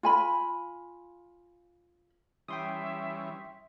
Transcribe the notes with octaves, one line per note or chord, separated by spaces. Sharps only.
F4 G#5 B5
E3 G3 C#4 E5 G5 C6 D#6